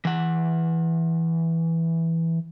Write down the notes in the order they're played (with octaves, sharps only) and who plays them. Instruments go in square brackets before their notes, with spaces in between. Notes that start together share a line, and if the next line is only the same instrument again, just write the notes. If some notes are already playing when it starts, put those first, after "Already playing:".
[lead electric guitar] E3 F#5